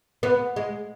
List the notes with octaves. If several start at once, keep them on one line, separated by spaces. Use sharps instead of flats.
B3
G#3